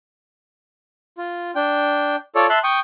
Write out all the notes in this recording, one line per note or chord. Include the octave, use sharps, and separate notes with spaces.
F4
D4 G5
F4 A4 C#5 D5
E5 A5 C6 F#6
G5 C#6 D#6